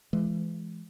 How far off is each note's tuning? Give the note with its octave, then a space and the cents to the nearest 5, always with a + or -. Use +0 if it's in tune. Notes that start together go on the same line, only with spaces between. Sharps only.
E3 +35 G#3 +30